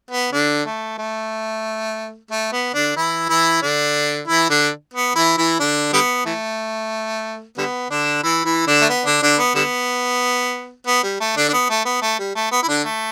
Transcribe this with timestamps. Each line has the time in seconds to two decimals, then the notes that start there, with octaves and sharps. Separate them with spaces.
0.11 B3
0.32 D3 D4
0.66 A3
0.98 A3
2.31 A3
2.52 B3
2.74 D3 D4
2.96 E3 E4
3.29 E3 E4
3.62 D3 D4
4.27 E3 E4
4.50 D3 D4
4.94 B3
5.15 E3 E4
5.38 E3 E4
5.60 D3 D4
5.93 D3 G3 B3
6.25 E3 A3
7.58 D3 G3 B3
7.90 D3 D4
8.23 E3 E4
8.45 E3 E4
8.67 D3 D4
8.81 A3
8.89 B3
9.06 D3 D4
9.22 D3 D4
9.38 B3
9.55 D3 G3 B3
10.87 B3
11.03 G3
11.20 A3
11.36 D3 D4
11.49 D4
11.53 B3
11.70 A3
11.85 B3
12.02 A3
12.19 G3
12.35 A3
12.51 B3
12.63 E4
12.68 D3 D4
12.84 A3